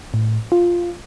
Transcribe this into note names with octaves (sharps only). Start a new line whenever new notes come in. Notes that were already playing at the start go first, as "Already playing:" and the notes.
A2
F4